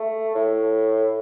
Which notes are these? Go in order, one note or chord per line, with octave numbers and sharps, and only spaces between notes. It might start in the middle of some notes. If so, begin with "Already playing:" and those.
Already playing: A3
A2